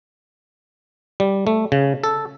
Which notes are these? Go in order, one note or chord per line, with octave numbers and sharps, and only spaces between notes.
G3
A3
C#3
A4